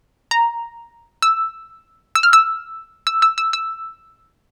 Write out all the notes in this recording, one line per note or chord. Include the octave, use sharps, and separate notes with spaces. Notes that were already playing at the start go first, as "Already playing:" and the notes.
A#5
E6
E6
F6
E6
E6
E6
E6
E6